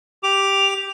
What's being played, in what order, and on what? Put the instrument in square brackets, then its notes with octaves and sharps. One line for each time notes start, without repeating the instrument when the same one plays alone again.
[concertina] G4 D6 [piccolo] F7